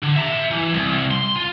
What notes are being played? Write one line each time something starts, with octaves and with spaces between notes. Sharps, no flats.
D3
E5 A#5
E3
C2
C6
F4